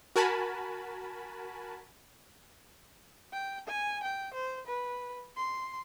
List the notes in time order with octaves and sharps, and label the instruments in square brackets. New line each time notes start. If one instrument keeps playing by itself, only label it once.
[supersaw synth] F#4 A#4 G#5 A5 B5
[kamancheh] G5
G#5
G5
C5
B4
C6